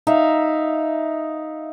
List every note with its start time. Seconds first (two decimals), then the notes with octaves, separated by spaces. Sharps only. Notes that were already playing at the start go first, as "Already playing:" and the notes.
0.07 D#4 E5 F5